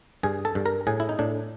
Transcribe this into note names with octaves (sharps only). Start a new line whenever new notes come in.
G2 G#4
A4
G2
A#4
A2 G#4
E4
D#4
A2 D4